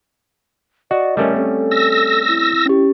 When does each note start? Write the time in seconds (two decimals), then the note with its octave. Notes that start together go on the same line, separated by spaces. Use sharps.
0.91 F#4 D5 D#5
1.17 G3 A3 C#4 A4 A#4
1.36 C4 A4
1.71 E6 A#6
2.28 E4
2.66 C#4 G4